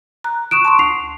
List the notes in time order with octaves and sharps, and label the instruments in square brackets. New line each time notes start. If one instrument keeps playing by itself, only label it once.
[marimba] A#5 F#6
[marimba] C#6 D#6 F#6 [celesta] D7 E7
[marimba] A5 C6 C#6
[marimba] D2 [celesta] C7 F7